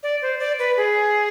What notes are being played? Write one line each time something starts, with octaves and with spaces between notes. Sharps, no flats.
D5
C5
D5
B4
G#4